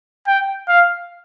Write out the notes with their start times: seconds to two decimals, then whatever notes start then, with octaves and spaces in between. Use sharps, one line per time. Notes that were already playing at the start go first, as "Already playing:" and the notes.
0.27 G5
0.68 F5